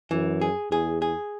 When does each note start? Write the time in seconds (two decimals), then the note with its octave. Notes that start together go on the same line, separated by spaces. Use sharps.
0.11 F#2 E3
0.41 G#4
0.71 E2 G#4
1.02 G#4